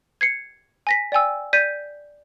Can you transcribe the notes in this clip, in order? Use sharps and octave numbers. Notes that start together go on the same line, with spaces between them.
G#6 C7 C#7
G#5 A#6 B6
D5 G5 G#5 E6
D5 G6 B6 D#7